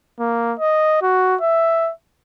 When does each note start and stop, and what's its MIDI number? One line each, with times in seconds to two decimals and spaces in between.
0.20 0.54 58
0.59 1.00 75
1.02 1.36 66
1.41 1.91 76